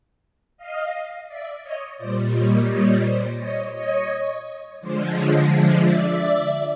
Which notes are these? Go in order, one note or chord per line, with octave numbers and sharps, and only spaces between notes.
D#5 F5
D5 E5
C#5 D#5
A#2 G3 C5 D5
C#5 D#5
C#5 D#5
C5 D5
C#5 D#5
C#5 D#5
D3 F3 G#3 C5 D5
C#5 D#5
D5 E5
D5 E5